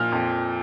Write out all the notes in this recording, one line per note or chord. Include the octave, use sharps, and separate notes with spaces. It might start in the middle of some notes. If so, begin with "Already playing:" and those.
Already playing: A#2 F3 F6
F2